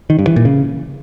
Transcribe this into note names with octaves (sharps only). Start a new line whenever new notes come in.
D#3
G2
E3
A#2
C#3